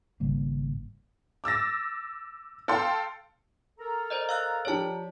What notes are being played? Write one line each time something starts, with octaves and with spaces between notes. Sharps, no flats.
G#1 C#3 G3 A#3
D6 E6 A6 A#6
A4 F5 G5 C6
A4 A#4 A#5
C5 D5 D#5
F5 E6 F#6
F3 G4 C#5 D5 A5